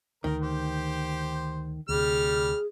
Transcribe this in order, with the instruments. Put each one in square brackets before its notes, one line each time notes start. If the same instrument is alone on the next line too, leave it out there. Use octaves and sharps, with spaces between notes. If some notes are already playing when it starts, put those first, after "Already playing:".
[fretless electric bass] D2 [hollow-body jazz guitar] D#3 [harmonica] A#4
[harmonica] G4 C5
[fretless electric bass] D2 C3 [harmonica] G3 F6 [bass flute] G#4